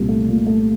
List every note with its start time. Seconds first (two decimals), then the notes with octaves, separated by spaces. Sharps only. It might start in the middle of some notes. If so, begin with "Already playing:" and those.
Already playing: C2 A#2
0.09 A3
0.28 A#2
0.46 A3